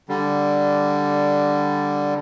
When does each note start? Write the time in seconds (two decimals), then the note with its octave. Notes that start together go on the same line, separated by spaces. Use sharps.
0.09 D3 G3